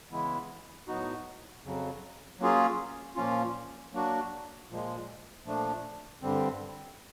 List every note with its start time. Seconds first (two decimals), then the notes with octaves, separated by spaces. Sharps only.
0.11 C#3 E3 G#3 B3 E4
0.87 A2 F#3 B3 D#4 F#4
1.64 F2 C#3 F#3
2.39 F#3 A#3 C#4 F4 G#4
3.16 A#2 F3 A#3 C#4 F4
3.93 F#3 A#3 D4 F#4
4.70 A#2 F3 G#3
5.45 A#2 F3 A3 D4
6.22 G2 D3 G3 C4